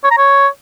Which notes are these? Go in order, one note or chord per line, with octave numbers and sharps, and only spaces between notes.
C#5
A#5
C#5